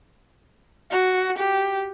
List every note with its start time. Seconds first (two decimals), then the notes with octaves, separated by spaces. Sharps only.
0.92 F#4
1.38 G4